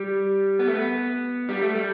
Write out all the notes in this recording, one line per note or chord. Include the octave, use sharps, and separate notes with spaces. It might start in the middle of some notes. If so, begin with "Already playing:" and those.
Already playing: G3
B3
A3
B3
G3
A3
G3